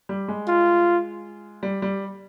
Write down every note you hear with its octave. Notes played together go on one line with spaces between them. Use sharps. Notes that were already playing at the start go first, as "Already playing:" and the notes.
G3
G#3
F4
G3
G3